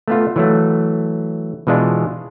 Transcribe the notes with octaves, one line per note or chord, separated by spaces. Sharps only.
A3 B3 F4
E3 F#3 A3
B2 E3 G#3 D4 F4